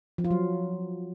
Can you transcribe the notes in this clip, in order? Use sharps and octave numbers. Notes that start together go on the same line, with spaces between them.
F3
F4
F#3